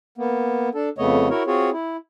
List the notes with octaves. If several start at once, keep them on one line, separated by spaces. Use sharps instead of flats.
A#3 B3
D4 A4
F2 C#3 A3 B3 C#5 D#5
E4 F#4 A#4 C#5
C4 F4 F#4 G#4 C#5
E4